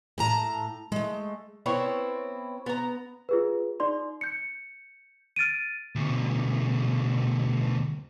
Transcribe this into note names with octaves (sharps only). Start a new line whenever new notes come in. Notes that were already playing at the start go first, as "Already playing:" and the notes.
A2 A5 A#5
G#3 A3
B3 C4 E4 C#5
B3 A#5
F4 G#4 B4
D#4 D5 C6
G6 C#7
F6 A6 D7 D#7
D2 B2